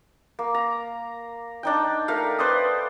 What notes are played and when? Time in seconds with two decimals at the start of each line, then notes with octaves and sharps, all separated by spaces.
0.39 A#3
0.55 A#5
1.63 D4 D#4 G5
2.08 A3 A#4 F5
2.39 B4 C5 D5 D#6